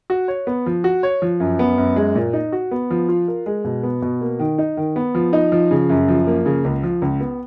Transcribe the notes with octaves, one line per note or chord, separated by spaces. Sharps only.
F#4
C#5
B3
F3
F#4
C#5
F3
F#2
B3
F#2
G#3
A#2
D#4
F#4
B3
F3
F4
A#4
G#3
B2
B3
B2
A#3
D#3
D#4
D#3
B3
F3
D#4
F3
C#3
F#2
F3
A#3
C#3
C#2
F3
C#2
B3